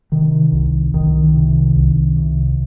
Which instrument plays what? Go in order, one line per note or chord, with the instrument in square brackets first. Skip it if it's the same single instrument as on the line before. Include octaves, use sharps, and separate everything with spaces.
[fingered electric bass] C3 D#3
C2
C2 D#3
C3
C2
C3